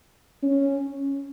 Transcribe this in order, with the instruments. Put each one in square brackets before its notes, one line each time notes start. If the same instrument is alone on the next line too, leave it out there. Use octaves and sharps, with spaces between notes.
[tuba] C#4